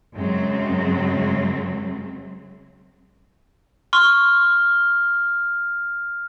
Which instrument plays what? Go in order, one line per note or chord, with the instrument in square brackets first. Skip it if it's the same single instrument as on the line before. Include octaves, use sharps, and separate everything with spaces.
[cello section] F#2 C#3 F#3 G#3 C4
[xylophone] C6 C#6 [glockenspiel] F6